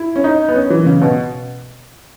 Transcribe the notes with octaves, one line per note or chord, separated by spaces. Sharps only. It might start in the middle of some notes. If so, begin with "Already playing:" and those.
Already playing: E4
C#4
D#4
B3
C#4
E3
C#3
B2